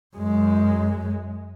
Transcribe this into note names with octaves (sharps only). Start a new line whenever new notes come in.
F#2 G#3